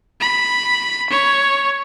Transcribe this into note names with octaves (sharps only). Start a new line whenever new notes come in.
B5
C#5